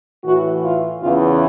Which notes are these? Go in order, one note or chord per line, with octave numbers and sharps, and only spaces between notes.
A2 E3 F#4
F4
E2 C#3 E3 F4